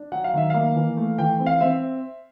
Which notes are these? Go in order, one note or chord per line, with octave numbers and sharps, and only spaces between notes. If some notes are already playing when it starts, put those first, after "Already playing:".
Already playing: D4
F#3 F#5
F5
D#3 E5
A#3 F5
E3
A3
E3 G5
C4
F5
C4 E5